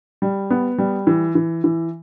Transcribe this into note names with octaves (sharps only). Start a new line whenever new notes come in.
G3
B3
G3
E3
E3
E3